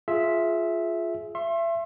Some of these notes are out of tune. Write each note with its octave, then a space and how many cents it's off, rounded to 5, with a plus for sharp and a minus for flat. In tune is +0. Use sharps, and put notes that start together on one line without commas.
F4 +0 G#4 +20 E5 +0
E5 +30 C6 +35